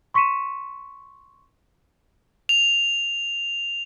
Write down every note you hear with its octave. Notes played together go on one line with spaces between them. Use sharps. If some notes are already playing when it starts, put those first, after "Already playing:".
C6 C#6 B6 C#7 D#7 E7
F7